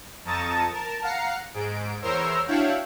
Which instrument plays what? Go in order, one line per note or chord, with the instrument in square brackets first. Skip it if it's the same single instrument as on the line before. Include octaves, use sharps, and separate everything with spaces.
[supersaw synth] F2 A5 A#5 C#6 D#6 A6
A#4 A5
F5 F#5 A#5 C7 C#7
G#2 D7
E2 A#4 C5 C#5 E6 C7
D4 E4 F#4 C#5 F5 G5